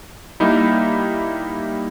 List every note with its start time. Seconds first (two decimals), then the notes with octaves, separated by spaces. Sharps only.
0.40 G3 A#3 D#4 E4